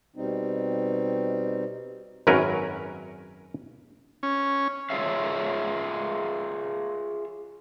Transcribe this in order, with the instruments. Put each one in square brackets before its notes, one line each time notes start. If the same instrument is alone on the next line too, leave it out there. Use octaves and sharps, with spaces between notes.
[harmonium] B2 G3 C4 D#4
[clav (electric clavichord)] G#1 F#2 F#3 C#4 A#4 B4
[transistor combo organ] C#4
[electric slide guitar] F4 G#4 C#5 E5 F5